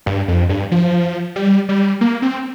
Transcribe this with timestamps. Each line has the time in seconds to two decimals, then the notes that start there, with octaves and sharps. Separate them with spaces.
0.06 G2
0.28 F2
0.49 G2
0.71 F3
1.36 G3
1.69 G3
2.01 A#3
2.22 C4